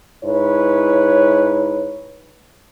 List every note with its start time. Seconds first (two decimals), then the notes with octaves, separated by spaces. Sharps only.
0.24 G#2 E4 B4 C#5